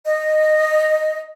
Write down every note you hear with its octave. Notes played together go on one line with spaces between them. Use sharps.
D#5